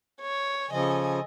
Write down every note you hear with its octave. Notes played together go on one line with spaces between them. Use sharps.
C#5
C#3 F3 A4 D#5 G#5